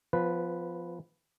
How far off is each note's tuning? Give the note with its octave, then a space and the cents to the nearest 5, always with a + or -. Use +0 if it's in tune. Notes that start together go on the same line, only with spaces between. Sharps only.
F3 +0 B3 +25 B4 +0